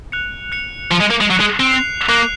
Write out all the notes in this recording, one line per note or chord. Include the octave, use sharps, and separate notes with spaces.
F#6 C#7 F7
F#6 C#7 F7
F3 F#6 C#7 F7
G#3
A#3
G#3
F#3 F#6 C7 F7
G#3
C4
F#6 C7 F7
A#3 F#6 C7 F7